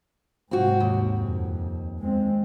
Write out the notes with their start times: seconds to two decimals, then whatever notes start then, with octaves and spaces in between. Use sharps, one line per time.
0.51 G#2 C3 C4 F#4
0.80 D#2
1.19 F2
2.00 G#3 C4